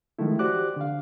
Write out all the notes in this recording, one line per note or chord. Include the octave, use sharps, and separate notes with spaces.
D#3 F3 G#3 A3 E4
F#4 G4 C5 D5 D6 F#6
D3 F5